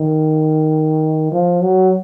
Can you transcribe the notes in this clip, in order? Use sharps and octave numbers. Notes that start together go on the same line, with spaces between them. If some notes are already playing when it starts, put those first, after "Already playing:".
Already playing: D#3
F3
F#3